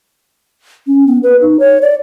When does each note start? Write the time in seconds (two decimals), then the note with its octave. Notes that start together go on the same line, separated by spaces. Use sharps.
0.87 C#4
1.07 B3
1.23 B4
1.41 D#4
1.60 C#5
1.82 D5